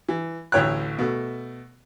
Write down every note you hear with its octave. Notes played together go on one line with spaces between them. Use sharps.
E3
A1 D2 A2 C#5 G5 F#6
B2 A3